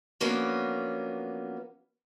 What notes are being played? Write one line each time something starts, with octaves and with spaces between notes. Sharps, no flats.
F3 F#3 A#3 B3 C#4 D4